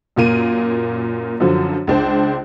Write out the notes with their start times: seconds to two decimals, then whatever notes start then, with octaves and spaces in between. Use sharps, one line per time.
0.16 F#2 A#2 A#3 D#7
1.40 F#2 D3 F3 F#3
1.87 C#2 D4 C5